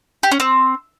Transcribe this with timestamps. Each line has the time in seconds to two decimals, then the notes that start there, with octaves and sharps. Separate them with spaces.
0.23 G4
0.31 C#4
0.40 C4